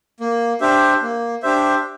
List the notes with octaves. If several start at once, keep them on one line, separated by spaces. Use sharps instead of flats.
A#3
D4 G4 C5 E5
A#3
D4 G4 C5 E5